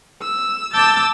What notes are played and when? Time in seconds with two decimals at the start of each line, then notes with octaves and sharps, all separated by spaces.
0.20 E6
0.73 A5 D6 E6 G6 A6